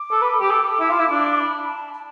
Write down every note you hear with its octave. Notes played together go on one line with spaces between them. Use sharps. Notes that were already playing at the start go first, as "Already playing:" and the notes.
Already playing: D6
A4
B4
G4
A4
E4
F4
E4
D4
B5
A5
A5